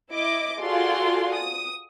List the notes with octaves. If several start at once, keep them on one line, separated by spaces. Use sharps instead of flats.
E4 D#5 D6
F4 F#4 G#4 A4 D5 C6
D#6